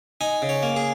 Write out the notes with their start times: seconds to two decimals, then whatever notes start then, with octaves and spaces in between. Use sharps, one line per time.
0.21 D#4 G#5
0.42 C#3
0.49 C#5
0.63 A#3
0.76 G#4